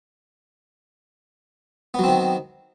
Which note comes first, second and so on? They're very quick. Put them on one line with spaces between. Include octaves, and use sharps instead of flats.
B3 F#3 C4 D#3